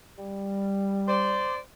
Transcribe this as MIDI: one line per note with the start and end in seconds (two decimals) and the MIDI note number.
0.17 1.49 55
1.07 1.57 72
1.07 1.57 74